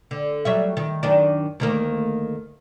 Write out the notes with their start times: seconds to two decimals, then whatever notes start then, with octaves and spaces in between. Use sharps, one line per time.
0.11 D3
0.45 F#3 G3 E5
0.77 D#3
1.03 F#2 D#3 D4
1.60 D2 D#3 A#3